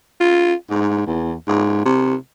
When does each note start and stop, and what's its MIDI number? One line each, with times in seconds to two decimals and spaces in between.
0.20 0.54 65
0.70 1.06 44
1.06 1.34 40
1.48 1.83 44
1.85 2.15 48